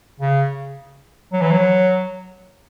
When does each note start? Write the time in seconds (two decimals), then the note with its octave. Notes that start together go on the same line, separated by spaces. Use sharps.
0.20 C#3
1.33 F#3
1.42 E3
1.52 F#3